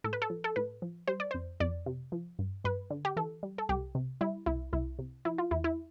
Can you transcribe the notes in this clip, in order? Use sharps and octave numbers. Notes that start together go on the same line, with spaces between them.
A2 A4
B4
A4
F3
A4
A2 B4
F3
G3 C5
D5
F2 C5
F2 D5
C3
F3
G2
G2 B4
D3
G4
E3 A4
G3
A4
C2 G4
C3
G3 E4
C2 E4
C2 E4
C3
F3 E4
F4
E2 E4
E4